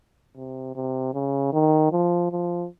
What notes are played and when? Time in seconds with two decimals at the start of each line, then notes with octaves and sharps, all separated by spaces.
0.36 C3
0.76 C3
1.14 C#3
1.53 D#3
1.92 F3
2.32 F3